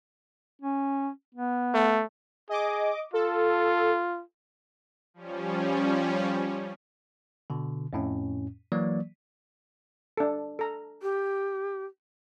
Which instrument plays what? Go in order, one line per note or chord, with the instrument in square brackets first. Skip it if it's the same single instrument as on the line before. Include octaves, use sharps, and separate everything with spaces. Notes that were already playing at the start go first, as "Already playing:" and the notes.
[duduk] C#4
B3
[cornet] A3
[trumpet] G#4 [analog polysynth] D#5 D6
[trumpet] F4 [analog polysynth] A4
[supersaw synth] F3 G3 C#4
[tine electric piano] B2 D3
F2 A2 C#4
E3 F#3 A#3 D5
[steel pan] D4 A4
A4 A#5
[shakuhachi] G4